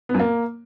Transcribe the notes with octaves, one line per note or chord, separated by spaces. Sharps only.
B3
F#2
A#3